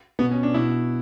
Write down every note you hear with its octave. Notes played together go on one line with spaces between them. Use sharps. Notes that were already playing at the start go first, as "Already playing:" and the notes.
B2 B3
C#4
D4
B2 E4